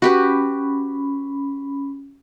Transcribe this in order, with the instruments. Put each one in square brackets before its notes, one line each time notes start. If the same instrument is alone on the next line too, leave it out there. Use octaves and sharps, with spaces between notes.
[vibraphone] C#4 B5 [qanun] F#4 G4 B4